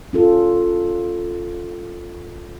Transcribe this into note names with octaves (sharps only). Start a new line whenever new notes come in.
C#4 F4 A4